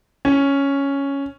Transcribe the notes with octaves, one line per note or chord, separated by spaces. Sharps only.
C#4